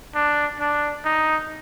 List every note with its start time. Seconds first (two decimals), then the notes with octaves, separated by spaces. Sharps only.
0.15 D4
0.60 D4
1.05 D#4